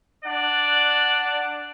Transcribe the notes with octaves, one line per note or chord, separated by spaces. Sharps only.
D4 D5 F#5